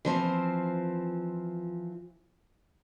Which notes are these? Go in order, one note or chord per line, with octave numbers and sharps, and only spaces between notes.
E3 F3 C4